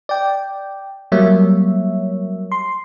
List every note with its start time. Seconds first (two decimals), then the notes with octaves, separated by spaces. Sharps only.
0.09 D5 G5
1.12 F#3 G3 A#3 C#5 E5
2.52 C6